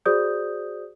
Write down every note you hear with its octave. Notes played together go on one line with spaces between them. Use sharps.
F#4 G#4 C5 D5 D#6 G6